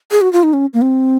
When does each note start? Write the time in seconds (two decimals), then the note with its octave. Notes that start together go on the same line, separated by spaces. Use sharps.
0.11 G#4
0.21 F#4
0.33 F4
0.43 D#4
0.53 C#4
0.74 A#3
0.82 C4